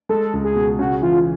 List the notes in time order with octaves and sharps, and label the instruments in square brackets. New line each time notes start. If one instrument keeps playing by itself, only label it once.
[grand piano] G#3 [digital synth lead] A4
[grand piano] C#2
[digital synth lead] G#4
[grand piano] B2
[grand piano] C#3 [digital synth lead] F#4
[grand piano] E3 [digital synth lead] F4